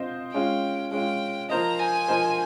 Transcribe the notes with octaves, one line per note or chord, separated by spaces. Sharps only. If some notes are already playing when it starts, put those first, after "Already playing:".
Already playing: C4 F4 C5 D#5
G#3 C#4 F4 G5
G#3 C#4 F4 G5
F3 A#3 F4 C5 D#5 A#5
G#5
F3 A#3 F4 C5 D#5